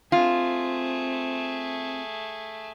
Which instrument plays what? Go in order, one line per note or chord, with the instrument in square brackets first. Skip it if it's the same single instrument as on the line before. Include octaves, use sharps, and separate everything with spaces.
[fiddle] A3 G#4 [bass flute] C4 [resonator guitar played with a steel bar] F4